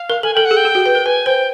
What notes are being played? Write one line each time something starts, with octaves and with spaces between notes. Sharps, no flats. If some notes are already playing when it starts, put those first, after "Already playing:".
Already playing: F5
A#4
A4 G#5
A4 G5
F#5
G#4
G5
G#4
F#4
B4
A#4
B4 G#5
C5 G5